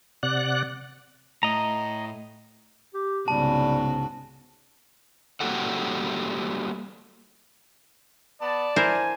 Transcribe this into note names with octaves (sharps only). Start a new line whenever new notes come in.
C3 D5 F#5 F#6
A2 D#5 A#5
G4
C2 G#2 C#3 G3 B3 F#4 A5
G3 A#3 F#4 G4 A4 F#5
B3 D5 A5
E4 A#4 C5 G#5